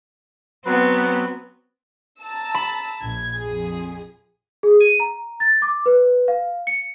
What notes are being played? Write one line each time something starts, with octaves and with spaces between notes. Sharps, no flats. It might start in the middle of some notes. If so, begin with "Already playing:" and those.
F#3 B3 C4 B4
A5 A#5 E6
B5
A#1 G#6
F2 G#4
G#4
D#7
A#5
A6
D6
B4
F5
C#7